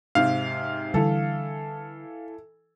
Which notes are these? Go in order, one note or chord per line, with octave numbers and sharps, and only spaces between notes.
G#2 C3 F5
D3 E3 G3 A4